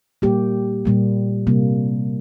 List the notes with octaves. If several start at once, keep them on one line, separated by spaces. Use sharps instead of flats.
A#2 G3 A#3 G4
A#2 G3 A#3
C3 G3 A#3